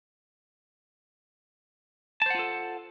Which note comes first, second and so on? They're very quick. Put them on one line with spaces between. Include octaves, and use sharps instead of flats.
A5 C5 F#5 F4 A4